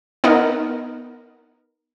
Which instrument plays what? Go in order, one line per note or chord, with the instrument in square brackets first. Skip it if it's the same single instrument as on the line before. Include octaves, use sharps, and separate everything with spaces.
[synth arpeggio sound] B3 D#4 A#4